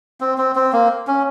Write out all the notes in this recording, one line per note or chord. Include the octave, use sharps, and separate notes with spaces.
C4
C4
C4
A#3
C#4